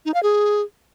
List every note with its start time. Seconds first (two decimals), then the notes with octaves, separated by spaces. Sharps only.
0.05 D#4
0.14 F5
0.23 G#4